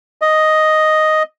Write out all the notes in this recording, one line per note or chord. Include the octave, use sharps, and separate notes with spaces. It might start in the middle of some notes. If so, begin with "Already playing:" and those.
D#5